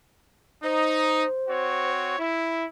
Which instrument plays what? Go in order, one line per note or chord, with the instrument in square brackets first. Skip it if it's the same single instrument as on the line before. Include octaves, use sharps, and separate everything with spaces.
[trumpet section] D#4 [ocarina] C5
[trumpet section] C4 F#4 C#5
E4